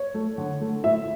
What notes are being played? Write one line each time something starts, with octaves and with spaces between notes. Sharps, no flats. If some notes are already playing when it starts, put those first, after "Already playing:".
Already playing: C#5
A3
D3
A3
A2 E5